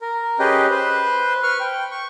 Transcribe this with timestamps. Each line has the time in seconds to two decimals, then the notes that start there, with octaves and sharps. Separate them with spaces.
0.01 A#4
0.39 C#4 G4 G#4 B4 D#5 G5
0.71 B4 C5
1.43 B4 C#6 F6
1.60 G5
1.91 C#6